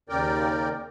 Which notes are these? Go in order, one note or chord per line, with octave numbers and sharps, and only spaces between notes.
D#2 C#3 A#4 D5 G5